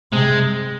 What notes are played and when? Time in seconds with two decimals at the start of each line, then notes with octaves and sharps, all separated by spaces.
0.12 C3 G#3